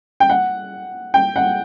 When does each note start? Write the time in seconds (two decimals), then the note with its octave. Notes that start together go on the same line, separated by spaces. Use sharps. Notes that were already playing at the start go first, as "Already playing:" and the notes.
0.20 G5
0.30 F#5
1.14 G5
1.36 F#5